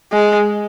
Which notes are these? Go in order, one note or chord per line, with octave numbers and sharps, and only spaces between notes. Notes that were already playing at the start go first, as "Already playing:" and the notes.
G#3